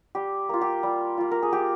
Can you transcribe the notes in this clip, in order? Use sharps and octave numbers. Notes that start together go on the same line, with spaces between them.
G3 G4
A#3 F4
G4
G3
A#3 F4
A#4
G#4
A#3 G4